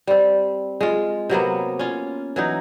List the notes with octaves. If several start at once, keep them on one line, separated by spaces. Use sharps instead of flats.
G3 C4
G#3 F4
C3 F#3 A#3 B3
C#4 F4
E3 F#3 D#4